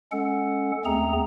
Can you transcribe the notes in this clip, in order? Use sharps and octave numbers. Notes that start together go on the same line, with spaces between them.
G#3 C#4 A4 F#5
D#2 A3 B3 C4 G#4 A#5